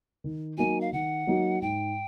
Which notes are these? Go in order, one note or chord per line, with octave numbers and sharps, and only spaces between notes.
D#3
F#3 A#3 D#4 F#4 G#5
F5
D#3 F#5
F#3 A#3 D#4 F#4
G#2 G5